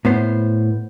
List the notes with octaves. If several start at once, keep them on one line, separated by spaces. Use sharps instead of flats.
A2 B3 C5